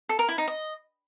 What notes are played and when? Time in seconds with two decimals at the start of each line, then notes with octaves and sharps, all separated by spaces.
0.09 A4
0.19 A#4
0.28 E4
0.38 D#4
0.48 D#5